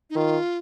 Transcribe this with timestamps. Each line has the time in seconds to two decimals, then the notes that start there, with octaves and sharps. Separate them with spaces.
0.10 D#4
0.16 D#3 F4